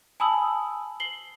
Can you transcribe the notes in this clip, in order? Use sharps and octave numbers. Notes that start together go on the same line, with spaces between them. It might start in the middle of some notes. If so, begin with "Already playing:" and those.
G#5 A5 B5 D#6 E6 F#7
C7 F#7 G7